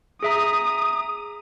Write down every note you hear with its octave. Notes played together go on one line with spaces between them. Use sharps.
G#4 E5 A#5 D#6